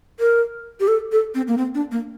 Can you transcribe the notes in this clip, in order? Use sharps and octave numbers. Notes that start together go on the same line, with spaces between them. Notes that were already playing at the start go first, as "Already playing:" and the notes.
A#4
G4
A4
A4
C4
A#3
C4
D4
A#3